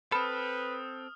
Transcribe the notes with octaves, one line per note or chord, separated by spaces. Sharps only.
C4 A4 B4 B5 D#6 F6